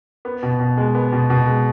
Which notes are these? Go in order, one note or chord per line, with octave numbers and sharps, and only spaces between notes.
B3
B2
B2
G#3
B3
B2
B2
G#3